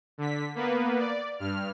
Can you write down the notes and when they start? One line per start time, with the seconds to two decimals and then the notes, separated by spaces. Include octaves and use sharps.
0.18 D3 B6
0.55 A#3 B3 B4
0.98 D5
1.39 G2 F6